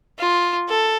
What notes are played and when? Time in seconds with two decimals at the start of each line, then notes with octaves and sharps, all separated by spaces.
0.18 F4
0.69 A4